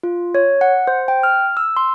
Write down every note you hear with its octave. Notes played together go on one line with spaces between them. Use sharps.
F4
C#5
F#5
C5
G5
F6
E6
C6